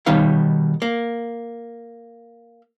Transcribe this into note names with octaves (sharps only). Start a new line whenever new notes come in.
B2 D#3 G3 D#4 C#5 F5
A#3